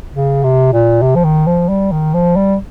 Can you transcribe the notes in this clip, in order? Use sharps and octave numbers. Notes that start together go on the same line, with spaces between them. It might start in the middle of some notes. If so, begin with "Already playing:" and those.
C#3
C3
A#2
C3
F3
D#3
F3
G3
D#3
F3
G3